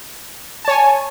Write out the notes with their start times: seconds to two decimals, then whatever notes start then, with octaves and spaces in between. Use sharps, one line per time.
0.65 A5
0.68 C#5
0.71 G#5